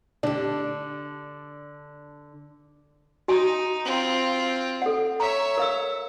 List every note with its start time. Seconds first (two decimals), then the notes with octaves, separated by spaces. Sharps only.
0.23 D3 D4 G4
3.28 D#4 F#4 G#5
3.85 C4 F4
4.82 A4 F#5
5.20 C#5 E5 A#5
5.57 A#4 F5 E6